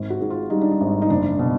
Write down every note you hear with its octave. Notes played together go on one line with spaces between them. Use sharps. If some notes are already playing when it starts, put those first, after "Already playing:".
Already playing: G#1
F#4
G#2
F4
G3 D#4
D4
D#4
G#1
D#4
F#1 D4
B2